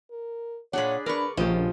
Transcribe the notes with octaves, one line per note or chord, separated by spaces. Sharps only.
A#4
A#2 D4 G#4 C#5 F#5 B5
D4 A#4 B4 D5 C#6
A#1 C#3 F3 G4 D#5